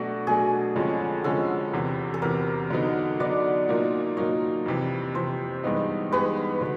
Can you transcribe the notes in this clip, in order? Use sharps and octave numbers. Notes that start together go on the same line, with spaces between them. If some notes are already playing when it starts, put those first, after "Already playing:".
Already playing: B2 F#3 A3 D4 F#4
B2 F#3 A3 D4 G#4
F2 D3 F3 G#3 C#4
F2 D3 F3 G#3 C#4 A4
E2 C3 E3
A4
E2 C3 E3 A#4
D3 F#3 B3 D#4
D3 F#3 B3 D#4 D5
A#2 F#3 A#3 D#4
A#2 F#3 A#3 D#4 C#5
F2 C3 E3
F2 C3 E3 C5
G2 E3 G#3 B3 D#4
G2 E3 G#3 B3 D#4 B4
D3 F#3 B3